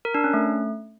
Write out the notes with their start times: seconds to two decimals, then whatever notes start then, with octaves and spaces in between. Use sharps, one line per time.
0.05 A#4
0.14 D4
0.24 C#4
0.34 A3